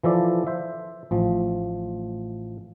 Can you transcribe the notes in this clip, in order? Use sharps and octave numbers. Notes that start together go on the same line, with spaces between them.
E3 F3 A4 D5
C5 E5
A1 F3